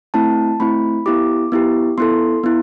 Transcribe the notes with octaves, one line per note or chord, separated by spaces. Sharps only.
A3 C4 E4 A5
A3 C4 E4 B5
B3 E4 G4 D6
B3 E4 G4
B3 E4 A4 C6
B3 E4